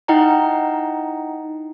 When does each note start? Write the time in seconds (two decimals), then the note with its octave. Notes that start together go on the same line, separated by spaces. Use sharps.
0.08 D#4 E4 D#5 F#5 G5 A#5